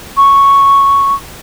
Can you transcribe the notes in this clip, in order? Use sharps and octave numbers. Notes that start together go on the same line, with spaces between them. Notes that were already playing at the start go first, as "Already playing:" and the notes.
C#6